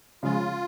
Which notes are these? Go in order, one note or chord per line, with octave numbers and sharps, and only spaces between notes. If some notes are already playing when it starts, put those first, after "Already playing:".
C#3 F3 G#3 F4